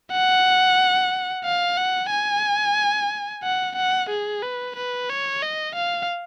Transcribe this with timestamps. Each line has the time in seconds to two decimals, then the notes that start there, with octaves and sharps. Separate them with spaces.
0.12 F#5
1.44 F5
1.77 F#5
2.11 G#5
3.43 F#5
3.76 F#5
4.10 G#4
4.42 B4
4.76 B4
5.09 C#5
5.42 D#5
5.76 F5